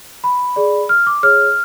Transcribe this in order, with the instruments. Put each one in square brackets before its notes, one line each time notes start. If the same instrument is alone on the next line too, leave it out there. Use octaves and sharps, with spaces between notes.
[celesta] B5
G#4 D5
F6
D6
G#4 C#5 F6